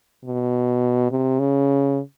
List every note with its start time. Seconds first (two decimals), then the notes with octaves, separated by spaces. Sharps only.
0.25 B2
1.11 C3
1.39 C#3